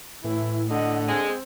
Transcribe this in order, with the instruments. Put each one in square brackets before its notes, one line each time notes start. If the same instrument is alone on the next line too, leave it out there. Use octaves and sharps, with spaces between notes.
[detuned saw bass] A2 [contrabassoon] E3 [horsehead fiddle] E4
[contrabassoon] D3 [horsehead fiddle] D#5 F#5
[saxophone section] G#3 [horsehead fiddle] C4